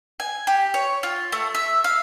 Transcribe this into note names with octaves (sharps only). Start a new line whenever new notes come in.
G#5
G4
C#5
F4
A3
E5
F5